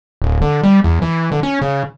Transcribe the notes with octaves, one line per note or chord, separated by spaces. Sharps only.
D1
D3
G3
E2
E3
D3
C#4
C#3